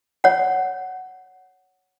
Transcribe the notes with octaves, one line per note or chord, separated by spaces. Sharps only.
C#5 F#5